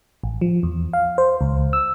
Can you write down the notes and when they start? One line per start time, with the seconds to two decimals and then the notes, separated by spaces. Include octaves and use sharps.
0.23 A1
0.41 F3
0.63 E2
0.93 F5
1.18 C5
1.41 C#2
1.73 E6